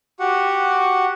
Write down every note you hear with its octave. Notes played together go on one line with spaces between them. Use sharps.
F#4 G4 F#5